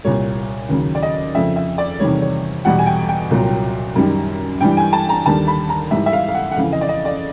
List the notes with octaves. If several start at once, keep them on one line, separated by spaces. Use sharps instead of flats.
C2 A#2 G3 C#5
D#2 C#3 F#3
D5
D#5
F2 C#3 F3 E5
E5
D5
E2 C3 D#3 G3 C#5
C#5
E2 B2 G3 F#5
G#5
G5
G5
C2 A#2 F#3
F#2 D#3 G3
G2 E3 G3 G5
G#5
A5
A#5
D#2 D3 G3 A5
B5
A#5
G#2 E3 G3 E5
E5
F5
F5
F#5
F#5
F2 C#3 E3 F5
D#5
D5
D#5
D5